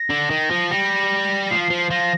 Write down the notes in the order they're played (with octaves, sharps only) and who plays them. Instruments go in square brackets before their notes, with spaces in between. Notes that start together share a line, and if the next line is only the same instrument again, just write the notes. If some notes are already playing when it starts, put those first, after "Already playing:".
Already playing: [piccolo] A#6
[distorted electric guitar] D3
D#3
F3
[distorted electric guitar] G3 [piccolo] A#6
[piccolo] A#6
[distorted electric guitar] F3 [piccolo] C7
[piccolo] C7
[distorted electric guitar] F3
[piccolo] C7
[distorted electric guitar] F3 [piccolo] A#6